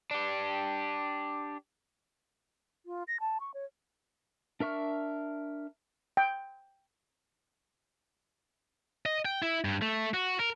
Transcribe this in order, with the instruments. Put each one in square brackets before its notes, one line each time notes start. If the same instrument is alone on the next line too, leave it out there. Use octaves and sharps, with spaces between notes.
[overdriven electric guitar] D4 G4
[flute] F4
A#6
A5
C#6
C#5
[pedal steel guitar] D4 A#4 E5 C#6 F6
[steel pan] G5
[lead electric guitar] D#5
G5
E4
G2
A3
F#4
A#4